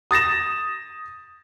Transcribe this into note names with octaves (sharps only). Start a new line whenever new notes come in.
D#6 A6 A#6 E7